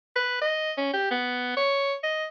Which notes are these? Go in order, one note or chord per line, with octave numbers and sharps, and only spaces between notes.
B4
D#5
C#4
G4
B3
C#5
D#5